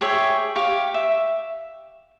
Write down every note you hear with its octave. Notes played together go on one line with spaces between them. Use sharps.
G4 G#4 C#5 E5
G4 F5 C#6
E5